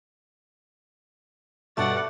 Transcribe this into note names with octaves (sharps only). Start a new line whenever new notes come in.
G2 B2 A3 D5 F#5 A6